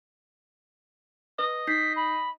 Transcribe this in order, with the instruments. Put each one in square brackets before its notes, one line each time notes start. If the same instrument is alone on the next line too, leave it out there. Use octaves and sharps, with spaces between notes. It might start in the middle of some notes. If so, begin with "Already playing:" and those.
[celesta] B4 [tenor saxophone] D#5
[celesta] D#4 G6 C7 [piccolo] B6
[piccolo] B5